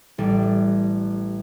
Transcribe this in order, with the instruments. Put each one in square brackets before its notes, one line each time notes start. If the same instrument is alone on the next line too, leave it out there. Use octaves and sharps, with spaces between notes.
[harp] A1 G3 D5